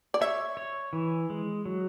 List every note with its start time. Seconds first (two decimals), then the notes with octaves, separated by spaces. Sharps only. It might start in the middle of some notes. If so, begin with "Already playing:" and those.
0.14 D5
0.21 C#5 E5
0.57 C#5
0.93 E3
1.30 G#3
1.65 F#3